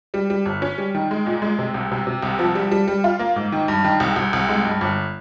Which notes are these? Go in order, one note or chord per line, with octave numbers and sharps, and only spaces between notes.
G3
G3
G1
C#4
G3
D#3
G#3
A#2
G#3
C3
C2
C3
C3
C2
F3
G3
G3
G3
F4
A#3
G#2
D#3
G2
D#3
C2
C2
C2
G#3
G2
G1